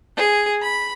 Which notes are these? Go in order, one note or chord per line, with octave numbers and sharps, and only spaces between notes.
G#4
B5